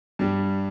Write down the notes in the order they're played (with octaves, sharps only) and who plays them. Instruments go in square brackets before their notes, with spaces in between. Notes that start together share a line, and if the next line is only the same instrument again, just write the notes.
[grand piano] G2 G3